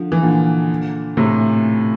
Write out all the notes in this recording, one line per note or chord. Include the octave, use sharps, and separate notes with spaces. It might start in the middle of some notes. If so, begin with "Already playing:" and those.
Already playing: D3 F3
E3
A#2 D3
A2 C3